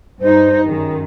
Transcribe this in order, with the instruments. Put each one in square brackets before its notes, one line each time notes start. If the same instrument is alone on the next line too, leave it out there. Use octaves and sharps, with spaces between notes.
[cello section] G2 D#4 [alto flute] C5
[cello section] F#2 D#3 [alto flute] G#4